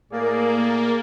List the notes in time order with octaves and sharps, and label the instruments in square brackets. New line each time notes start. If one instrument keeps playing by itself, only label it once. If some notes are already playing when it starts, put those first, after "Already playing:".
[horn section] A2 G#4 D5 [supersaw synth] A#3